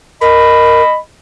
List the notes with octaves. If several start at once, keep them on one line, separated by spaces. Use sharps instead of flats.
A#4 D#5 B5